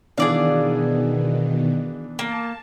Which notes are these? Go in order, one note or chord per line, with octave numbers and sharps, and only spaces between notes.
B2 D#3 E3 B3 D4 G#4 D5 F5
A#3 A5